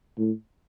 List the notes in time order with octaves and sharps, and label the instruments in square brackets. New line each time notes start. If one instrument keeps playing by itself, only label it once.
[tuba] A2